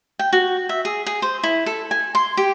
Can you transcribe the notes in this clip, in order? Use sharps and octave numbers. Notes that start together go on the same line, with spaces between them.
G5
F#4
E5
G#4
G#4
C5
E4
A4
G#5
C6
G4